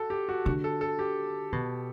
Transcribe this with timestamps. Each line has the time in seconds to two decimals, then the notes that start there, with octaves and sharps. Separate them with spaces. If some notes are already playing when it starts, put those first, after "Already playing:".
Already playing: F#4 A4
0.10 G4
0.29 F#4
0.45 D3 F#4
0.64 A4
0.81 A4
0.99 G4
1.52 B2